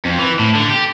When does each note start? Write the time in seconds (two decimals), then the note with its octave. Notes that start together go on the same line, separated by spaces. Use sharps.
0.05 F2
0.19 E3
0.39 A2
0.55 D3
0.70 G4